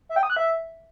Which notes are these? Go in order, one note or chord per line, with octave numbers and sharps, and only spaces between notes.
E5
G5
D#6
F#6
E5